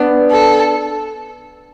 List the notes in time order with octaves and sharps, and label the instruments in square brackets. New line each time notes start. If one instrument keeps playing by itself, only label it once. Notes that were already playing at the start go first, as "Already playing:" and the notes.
Already playing: [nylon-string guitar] B3 D4
[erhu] A4